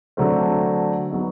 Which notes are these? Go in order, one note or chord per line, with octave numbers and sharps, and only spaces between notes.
D3 F#3 A3 C4
F#3 B3 D#4